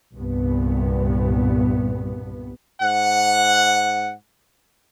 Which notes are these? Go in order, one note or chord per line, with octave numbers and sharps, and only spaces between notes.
C2 G2 A#2 B3
G#2 F#5